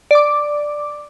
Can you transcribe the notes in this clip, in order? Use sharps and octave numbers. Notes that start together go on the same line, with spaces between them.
D5 D6